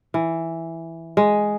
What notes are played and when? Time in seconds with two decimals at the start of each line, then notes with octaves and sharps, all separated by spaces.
0.14 E3
1.17 G#3